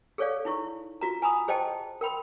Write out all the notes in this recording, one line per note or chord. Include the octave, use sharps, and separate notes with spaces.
G#4 A4 C#5 D5 F5
D#4 E4 C#6
F4 F#4 A#5
G#5 A#5 B5 D#6
G#4 C5 D#5 G5 A5
A#4 G5 B5 C6